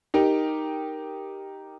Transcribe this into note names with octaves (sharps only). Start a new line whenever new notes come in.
D#4 G4 A#4